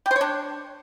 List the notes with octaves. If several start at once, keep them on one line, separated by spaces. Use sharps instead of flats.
G4
C5
C#5
D4